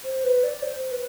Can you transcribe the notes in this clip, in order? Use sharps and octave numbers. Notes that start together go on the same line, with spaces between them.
C5
B4
D5
C5
B4